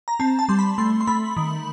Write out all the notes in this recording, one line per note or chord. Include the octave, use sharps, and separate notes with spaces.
A#5
C4 A5
A5
G3 C6
B5
A3 C6
C6
A3 B5
D#3